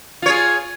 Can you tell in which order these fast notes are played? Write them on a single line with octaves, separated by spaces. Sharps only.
F4 C#5 G#4